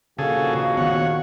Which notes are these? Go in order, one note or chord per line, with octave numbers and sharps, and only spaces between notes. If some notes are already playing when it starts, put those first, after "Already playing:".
A#1 D#2 C#3 F#4 G#4 A4 F5
D#3 B3 C#5 F#5